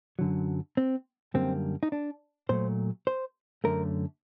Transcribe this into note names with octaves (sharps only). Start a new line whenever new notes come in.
F#2 D3 F#3
C4
F#2 D3 G3 A#3 C4
D#4
D4
A#2 F#3 A3 C5
C5
F#2 D3 A3 A#4